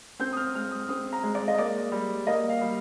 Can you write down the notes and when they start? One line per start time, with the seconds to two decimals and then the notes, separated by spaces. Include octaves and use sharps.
0.19 C4 G6
0.32 D#6
0.37 F6
0.55 G#3 F6
0.71 D#6
0.89 C4 D#6
1.13 A#5
1.23 G#3
1.35 D5
1.48 D#5
1.58 A#3 D5
1.92 G3
2.27 A#3 D#5
2.50 F5
2.61 G3